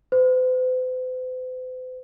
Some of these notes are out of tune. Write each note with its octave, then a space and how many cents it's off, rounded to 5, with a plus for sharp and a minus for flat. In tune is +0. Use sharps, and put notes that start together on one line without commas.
C5 -45